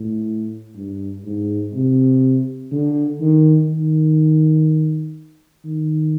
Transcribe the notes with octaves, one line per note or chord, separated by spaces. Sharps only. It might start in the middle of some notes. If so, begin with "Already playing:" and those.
Already playing: A2
G2
G#2
C3
D3
D#3
D#3
D#3